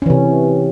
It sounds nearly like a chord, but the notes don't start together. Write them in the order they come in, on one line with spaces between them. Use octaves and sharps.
C#4 E3 C3